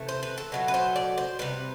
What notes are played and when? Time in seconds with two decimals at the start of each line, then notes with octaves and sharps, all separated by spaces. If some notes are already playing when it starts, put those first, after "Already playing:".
Already playing: C3 E3 A3
0.08 C5
0.23 B4
0.38 A4
0.52 B2 F#3 A3
0.68 B4
0.74 C5
0.96 D5
1.18 C5
1.39 C3 G3 B4